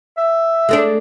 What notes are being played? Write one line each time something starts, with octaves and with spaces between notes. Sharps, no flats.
E5
G#3 A3 D4